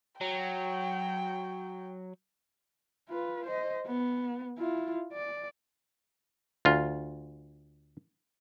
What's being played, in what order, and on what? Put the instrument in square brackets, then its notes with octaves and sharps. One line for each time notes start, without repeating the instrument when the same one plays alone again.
[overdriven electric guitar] F#3 [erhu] G5
[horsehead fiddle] F4 B4
C5 D#5
B3
E4 F4
D5
[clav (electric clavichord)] D2 F4